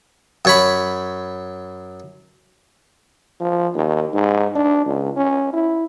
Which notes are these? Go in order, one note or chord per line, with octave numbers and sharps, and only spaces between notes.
F#2 C#5 B5
F3
D#2
G#2
D4
C#2
C#4
E4